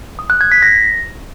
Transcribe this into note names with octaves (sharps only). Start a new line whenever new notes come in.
D#6
F#6
G#6
B6
A#6